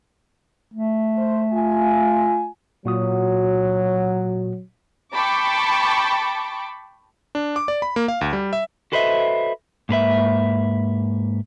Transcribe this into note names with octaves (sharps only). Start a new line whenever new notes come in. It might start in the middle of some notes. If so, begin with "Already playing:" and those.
A3
C5
F4 G#5
A#2 F#3 F#4 D#6
G5 A5 B5 C#6 D6
D4
D6
D5
B5
A#3
F5
D2
G3
E5
F#4 A4 B4 C5 D#5 E5
G#2 A#3 B4 E5